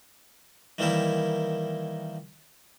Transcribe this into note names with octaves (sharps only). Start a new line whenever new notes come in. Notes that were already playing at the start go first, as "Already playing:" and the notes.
D#3 E3 G3 A#3 E4